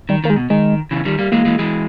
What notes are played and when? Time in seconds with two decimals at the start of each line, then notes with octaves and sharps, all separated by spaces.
0.09 D#3 G3
0.24 D#3 A#3
0.30 G#3
0.36 B2
0.50 D#3 G#3
0.91 C#3 E3
1.05 D#3 G3
1.19 G3 A#3
1.32 E3 G#3 A#3
1.45 E3 G#3
1.59 E3 G#3